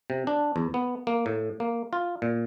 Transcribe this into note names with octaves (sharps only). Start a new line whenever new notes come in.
C3
D4
E2
B3
A#3
A2
A#3
F4
A#2